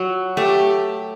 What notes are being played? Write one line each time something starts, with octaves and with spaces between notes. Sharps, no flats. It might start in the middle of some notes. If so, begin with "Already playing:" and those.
Already playing: F#3
A3 G4